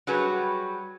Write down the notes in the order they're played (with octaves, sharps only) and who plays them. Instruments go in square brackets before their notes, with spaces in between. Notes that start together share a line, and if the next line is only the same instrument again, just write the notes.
[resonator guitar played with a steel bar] F#3 G3 F#4 G#4 B4